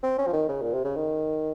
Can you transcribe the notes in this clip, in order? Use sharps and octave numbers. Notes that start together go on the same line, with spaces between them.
C4
C#4
F3
D#3
C#3
A#2
C3
C#3
D#3